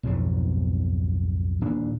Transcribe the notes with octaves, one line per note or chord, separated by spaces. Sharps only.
B1 F2 G#2 B2
D#1 A#2 E3 D4